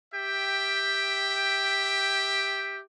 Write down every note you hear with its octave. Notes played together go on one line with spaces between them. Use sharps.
G4 E5 G5